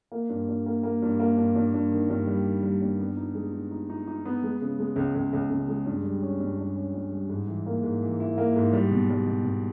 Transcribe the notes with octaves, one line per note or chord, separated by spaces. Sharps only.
A#3
G2
G2
A#3
A#3
G2
A#3
G2
G2
G2
D#3
G2
G3
D#3
G3
G2
B3
D#4
G#3
D#4
D#4
D#4
D#4
B3
G#3
C#3
G#3
C#2
C#2
C#2
C#2
G#3
G2
G3
C#4
G2
G2
C#4
G2
G3
G#2
E3
A#3
G#2
E3
E4
A#3
G#2
G3
B2
G3
B2
B2